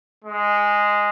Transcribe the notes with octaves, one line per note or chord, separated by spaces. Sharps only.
G#3